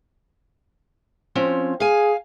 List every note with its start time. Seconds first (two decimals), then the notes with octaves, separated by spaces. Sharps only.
1.35 F3 C4 C#4
1.80 G#4 F5 G#5